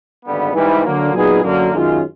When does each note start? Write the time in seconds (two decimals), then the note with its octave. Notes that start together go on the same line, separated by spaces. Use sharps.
0.25 G#1 G2 D3 G3 B3
0.55 G#2 E3 G3
0.84 D3 F#3 A#3
1.13 A#2 F#3 B3 D#4 G#4
1.43 F#2 D3 F#3 A#3
1.72 F#2 D#3 G#3 C#4 F4